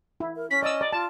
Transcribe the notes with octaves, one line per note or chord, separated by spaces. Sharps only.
E4
A#4
C#4 B6
D5 D#5 E6
D5
F4 A5